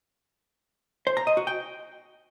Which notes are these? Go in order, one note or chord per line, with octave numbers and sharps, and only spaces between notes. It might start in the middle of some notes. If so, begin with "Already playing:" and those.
C5
A#5
D#5
F#4
G5